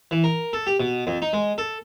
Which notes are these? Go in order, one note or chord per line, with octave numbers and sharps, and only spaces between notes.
E3
A#4
A4
G4
B2
F2
D#4
G#3
A4